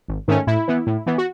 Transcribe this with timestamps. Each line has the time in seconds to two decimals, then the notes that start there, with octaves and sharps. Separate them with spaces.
0.08 G#1
0.28 G#2 D#3 A3 C#4
0.47 A2 E4
0.68 E3 B3
0.87 A2
1.07 E3 B3
1.18 F#4